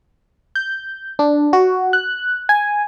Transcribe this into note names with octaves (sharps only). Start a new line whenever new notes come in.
G6
D4
F#4
F#6
G#5